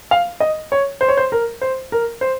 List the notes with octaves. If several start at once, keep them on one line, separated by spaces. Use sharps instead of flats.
F5
D#5
C#5
C5
C#5
C5
A#4
C5
A#4
C5